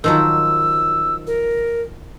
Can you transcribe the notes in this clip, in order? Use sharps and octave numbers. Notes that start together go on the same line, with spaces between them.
D#3 F3 F#3 E6
A#4